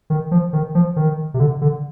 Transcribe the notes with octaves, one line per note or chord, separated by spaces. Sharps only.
D#3
F3
D#3
F3
D#3
C3
D3
D3